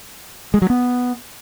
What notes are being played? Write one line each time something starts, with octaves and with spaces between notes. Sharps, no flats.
G#3
F#3
B3